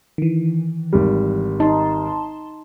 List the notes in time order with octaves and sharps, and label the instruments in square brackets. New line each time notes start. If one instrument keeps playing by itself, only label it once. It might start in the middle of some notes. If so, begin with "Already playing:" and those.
[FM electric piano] D#3 E3
[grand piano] G#1 G3
[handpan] D#4 [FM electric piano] A5 C6